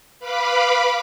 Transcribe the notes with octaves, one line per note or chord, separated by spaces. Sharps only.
B4 F5 B5 D6